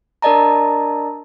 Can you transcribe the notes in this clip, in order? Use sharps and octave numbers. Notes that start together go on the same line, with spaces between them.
D4 A#4 D5 D#5 A5 A#5